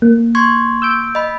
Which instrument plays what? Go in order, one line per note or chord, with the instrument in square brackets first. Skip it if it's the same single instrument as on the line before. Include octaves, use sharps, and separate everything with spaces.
[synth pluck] A#3
[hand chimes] C6 C#6 G#6
[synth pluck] E6 G6 D7
[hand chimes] D#5 B5